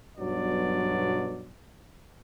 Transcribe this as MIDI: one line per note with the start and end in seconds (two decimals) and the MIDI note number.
0.18 1.51 35
0.18 1.51 43
0.18 1.51 47
0.18 1.51 54
0.18 1.51 74